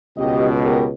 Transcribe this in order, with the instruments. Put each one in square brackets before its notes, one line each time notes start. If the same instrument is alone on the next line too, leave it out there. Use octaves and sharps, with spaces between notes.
[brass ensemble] C#2 B2 [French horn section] G4 D#5
[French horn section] B3 G4 A#4